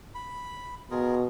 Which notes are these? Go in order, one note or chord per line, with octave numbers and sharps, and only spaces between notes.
B5
B2 F4 G#4 A#4